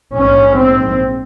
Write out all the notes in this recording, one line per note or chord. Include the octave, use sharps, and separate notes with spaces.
A#1 G#2 C#4
C4